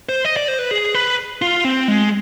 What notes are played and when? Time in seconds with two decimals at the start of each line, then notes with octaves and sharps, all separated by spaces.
0.09 C5
0.25 D#5
0.36 D5
0.48 C5
0.59 B4
0.71 G#4
0.95 B4
1.42 F4
1.65 C4
1.88 G#3